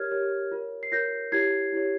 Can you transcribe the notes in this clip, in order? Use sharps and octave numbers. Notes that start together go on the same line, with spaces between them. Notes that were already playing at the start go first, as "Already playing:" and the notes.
Already playing: G4 A#4 C#5 F6 G#6
G4 A#4 C#5
F4 A#4 C#5
C7
F4 A#4 C#5 G6 A#6
E4 G4 C#5 G#6 C7
E4 G4 C#5